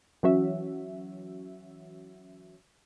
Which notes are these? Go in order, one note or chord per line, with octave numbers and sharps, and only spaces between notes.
E3 F#3 C#4 F#4 E5